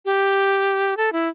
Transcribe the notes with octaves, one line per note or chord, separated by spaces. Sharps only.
G4
A4
E4